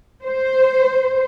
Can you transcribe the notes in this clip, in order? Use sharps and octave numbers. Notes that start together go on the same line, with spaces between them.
C5